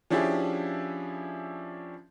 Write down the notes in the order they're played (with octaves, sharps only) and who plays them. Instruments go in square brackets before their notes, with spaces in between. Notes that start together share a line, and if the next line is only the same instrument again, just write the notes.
[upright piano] F3 C#4 D4 E4 G4 G#4